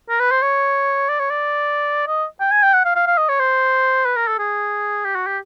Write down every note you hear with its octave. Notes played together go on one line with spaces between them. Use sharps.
A#4
B4
C5
C#5
D5
C#5
D5
D#5
G5
G#5
G5
F#5
F5
F5
F5
D#5
C#5
C5
B4
A#4
A4
G#4
G4
F#4
G4